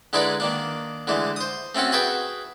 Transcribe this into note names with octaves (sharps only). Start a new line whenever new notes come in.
D3 G#3 D#4 E4 B4 D5
D#3 A#3 D4
D3 E3 G#3 A3
C5 D#6
A3 C4 C#4 F#4 A4
F#4 G#4 B4 E5 G5 A5